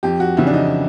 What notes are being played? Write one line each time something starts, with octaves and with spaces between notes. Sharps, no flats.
F2 G4
F#4
C#3 E3 E4
D4
D#4